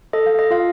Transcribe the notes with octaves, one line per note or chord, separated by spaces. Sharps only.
A4 D#5
F5
D#5
F4 F5